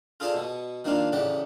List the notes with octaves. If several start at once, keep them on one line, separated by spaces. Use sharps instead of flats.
F4 G#4 A4 C5 D5 A5
B2 B3
D#3 A#3 C4 D4 F4
A1 A2 C#3 G4 D5 F#5